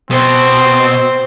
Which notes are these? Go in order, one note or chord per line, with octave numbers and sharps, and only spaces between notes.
B2 C4 C5